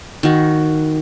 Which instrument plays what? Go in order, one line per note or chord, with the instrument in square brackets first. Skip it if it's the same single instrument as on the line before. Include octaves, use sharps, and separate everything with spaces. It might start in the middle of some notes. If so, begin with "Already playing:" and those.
[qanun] D#3 F#4